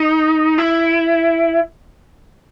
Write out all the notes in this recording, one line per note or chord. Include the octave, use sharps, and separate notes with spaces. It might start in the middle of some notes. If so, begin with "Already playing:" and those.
Already playing: D#4
E4